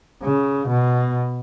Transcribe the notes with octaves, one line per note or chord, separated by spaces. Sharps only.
C#3
B2